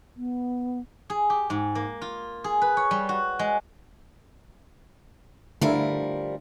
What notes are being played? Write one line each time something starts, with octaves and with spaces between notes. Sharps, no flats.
B3
G#4
G4
G#2
A#3
F4
G#4
B4
C#5
G3
F#4
G#3
D3 F3 G3 A3 E4 A#4